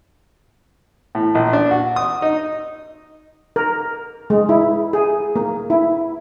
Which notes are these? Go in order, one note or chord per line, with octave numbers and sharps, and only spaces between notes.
A2
A#1
D4
F#4
D#6
D#4
A#4
G#3
E4
G#4
A#3
E4